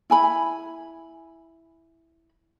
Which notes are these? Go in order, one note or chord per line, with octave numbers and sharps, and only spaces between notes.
E4 G#5 B5